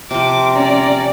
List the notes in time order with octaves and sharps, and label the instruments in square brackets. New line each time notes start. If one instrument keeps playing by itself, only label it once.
[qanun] C3 F3 [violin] D6
[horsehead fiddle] C#4 A#5 [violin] D5